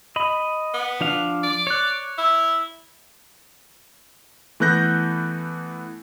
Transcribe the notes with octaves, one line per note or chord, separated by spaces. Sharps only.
D#5 B5
B3
F3 D4 F5
D5
C#5 F#6
E4
E3 A3 B3 F#6 G6 A#6